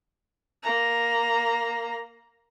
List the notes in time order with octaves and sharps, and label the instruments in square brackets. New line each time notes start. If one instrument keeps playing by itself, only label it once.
[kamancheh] A#3 A#5